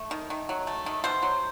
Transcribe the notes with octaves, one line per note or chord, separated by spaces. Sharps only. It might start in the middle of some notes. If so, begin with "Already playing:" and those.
Already playing: A3
D#3
D#3
F#3
A3
D#3
B2 C5
F#3